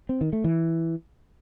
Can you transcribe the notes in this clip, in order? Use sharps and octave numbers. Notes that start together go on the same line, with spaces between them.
C4
D#3
A3
E3